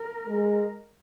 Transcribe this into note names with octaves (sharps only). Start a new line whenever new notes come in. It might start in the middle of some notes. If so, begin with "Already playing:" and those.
Already playing: A#4
G#3